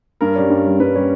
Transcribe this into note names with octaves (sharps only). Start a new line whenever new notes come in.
G2 A#4
G3 C#4
G2
G3 C#4
G2 B4
G3 C#4